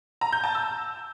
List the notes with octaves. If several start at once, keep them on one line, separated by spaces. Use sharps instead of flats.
A#5
G6
A5
E6